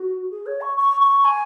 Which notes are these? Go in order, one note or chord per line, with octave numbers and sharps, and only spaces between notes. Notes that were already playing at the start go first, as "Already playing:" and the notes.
Already playing: F#4
G#4
C#5
C#6
C#6
C#6
G#5